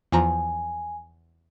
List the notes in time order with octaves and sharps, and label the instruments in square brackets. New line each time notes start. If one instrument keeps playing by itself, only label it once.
[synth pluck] E2 F3 A#5 [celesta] G#5